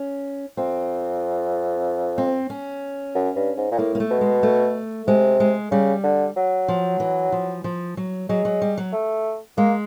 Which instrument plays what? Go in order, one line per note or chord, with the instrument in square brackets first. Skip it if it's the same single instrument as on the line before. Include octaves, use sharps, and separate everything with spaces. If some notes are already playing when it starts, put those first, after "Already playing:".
Already playing: [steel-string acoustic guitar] C#4
[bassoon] F2 [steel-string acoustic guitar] C4
[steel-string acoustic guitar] C4
C#4
[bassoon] F#2
G2
G#2
A#2
[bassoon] A2 [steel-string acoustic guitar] A#3
[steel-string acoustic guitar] A#3
A3
[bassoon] B2
[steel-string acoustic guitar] G#3
A3
[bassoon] C3 [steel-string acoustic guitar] G#3
[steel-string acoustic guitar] G#3
[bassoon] C#3 [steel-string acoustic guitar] G3
[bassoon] D3
F#3
[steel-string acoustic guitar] F3
E3
F3
F3
F#3
[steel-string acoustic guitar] F#3 [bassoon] G#3
[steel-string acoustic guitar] F#3
G3
F#3
[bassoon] A3
[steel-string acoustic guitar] G#3 [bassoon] A#3